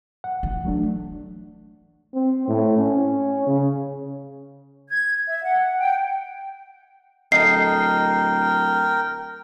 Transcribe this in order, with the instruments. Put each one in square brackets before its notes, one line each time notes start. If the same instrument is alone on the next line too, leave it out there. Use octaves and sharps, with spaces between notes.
[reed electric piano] F#5
[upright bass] E3
[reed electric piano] F#3 A3 D4
[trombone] C4
A2
C#4
C#3
[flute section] G#6
E5
F#5
G5
[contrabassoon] D1 [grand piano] A4 D#5 [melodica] A#4 G5 [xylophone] C7